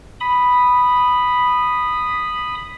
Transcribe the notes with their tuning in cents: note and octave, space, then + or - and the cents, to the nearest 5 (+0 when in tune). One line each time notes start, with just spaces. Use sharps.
B5 +0 D#6 -10